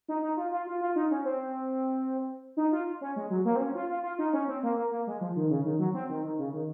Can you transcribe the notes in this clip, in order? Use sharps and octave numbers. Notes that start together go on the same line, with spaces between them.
D#4
D#4
F4
F4
F4
F4
D#4
C#4
C4
D#4
F4
C#4
G#3
F#3
A#3
C4
C#4
F4
F4
F4
D#4
C#4
C4
A#3
A#3
A#3
G#3
F3
D#3
C#3
D#3
F#3
C4
D#3
D#3
C#3
D#3